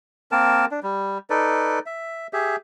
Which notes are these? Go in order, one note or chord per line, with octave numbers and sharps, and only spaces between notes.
A#3 C4 A#4 A5
D4
G3
D#4 A4 B4 D5
E5
G4 G#4 E5